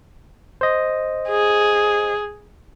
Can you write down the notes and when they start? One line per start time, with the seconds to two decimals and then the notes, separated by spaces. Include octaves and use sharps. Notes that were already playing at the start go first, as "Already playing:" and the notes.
0.61 C5 D#5
1.28 G#4